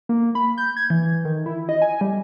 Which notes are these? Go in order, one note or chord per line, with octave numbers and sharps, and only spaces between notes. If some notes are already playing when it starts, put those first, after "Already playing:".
A#3
B5
G6
G#6
E3
D#3
E4
D#5
G#5
G3